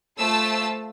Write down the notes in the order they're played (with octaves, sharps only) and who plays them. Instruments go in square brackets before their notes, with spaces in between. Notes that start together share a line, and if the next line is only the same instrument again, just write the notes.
[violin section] A3 F4 C5 A5 E6